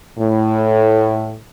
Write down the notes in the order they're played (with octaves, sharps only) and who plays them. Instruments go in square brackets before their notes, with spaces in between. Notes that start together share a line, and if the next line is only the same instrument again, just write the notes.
[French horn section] A2